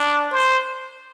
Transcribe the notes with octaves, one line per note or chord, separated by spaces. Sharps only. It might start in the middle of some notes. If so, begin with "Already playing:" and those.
Already playing: D4
C5